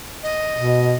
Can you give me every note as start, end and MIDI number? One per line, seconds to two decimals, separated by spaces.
0.23 0.97 75
0.56 0.96 47